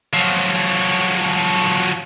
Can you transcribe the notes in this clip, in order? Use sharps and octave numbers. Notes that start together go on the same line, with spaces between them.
F3 F#3